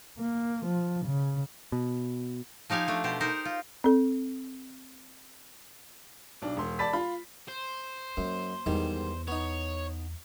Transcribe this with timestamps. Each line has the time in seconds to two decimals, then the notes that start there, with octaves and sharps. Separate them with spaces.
0.19 A#3
0.66 F3
1.06 C#3
1.72 B2
2.70 F3 D#4 G4 F5 G#5
2.88 A3 D4
3.04 B2 G4 C5
3.20 D#4 A#4 C5
3.45 F4
3.84 C4 A4
6.42 B1 D4
6.57 E1 C6
6.79 D5 A5 B5 A6 B6
6.93 F4 B5
7.48 C5
8.17 F#2 A#3
8.66 E2 G#2 D#3 G3
9.28 B3 D#4 C#5